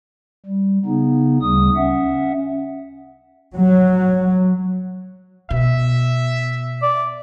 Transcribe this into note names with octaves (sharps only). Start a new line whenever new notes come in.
G3
C#3 B3 D#4
D2 C#3 G3 D#6
C#4 E5 F#5
F#3
B2 E5
D5